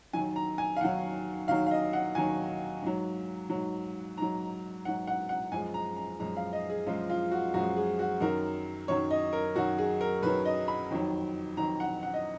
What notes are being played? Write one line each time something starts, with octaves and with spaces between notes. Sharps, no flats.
D#2 D#3 F#3 G#5
A#5
G#5
F5
D#2 D#3 F#3 F#5
D#2 D#3 F#3 F5
F5
D#5
F#5
D#2 D#3 F#3 G#5
G#2 F#3
G#2 F#3
G#2 F#3 A#5
G#2 F#3 F#5
F#5
F#5
F#2 F3 G#3 G#5
A#5
A#5
F#2 F3 G#3 A#5
F5
D#5
G#4
F#2 F3 G#3 F4
F4
F#4
F#2 F3 G#3 F#4
G#4
F#4
F#2 D#3 F#3 A#4
F#2 D#3 F#3 C#5
D#5
A#4
F#2 D#3 F#3 F#4
G#4
A#4
F#2 D#3 F#3 B4
D#5
B5
F2 D#3 F#3
F2 D#3 F#3 A#5
F#5
F#5
D#5